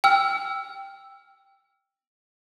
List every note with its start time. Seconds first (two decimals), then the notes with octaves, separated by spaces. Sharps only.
0.04 G5 E6 F6